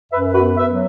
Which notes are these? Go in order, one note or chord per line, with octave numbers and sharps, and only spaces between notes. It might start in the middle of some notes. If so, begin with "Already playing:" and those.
F#2 B4 E5
F#4 B4
B3
B4 E5
F#3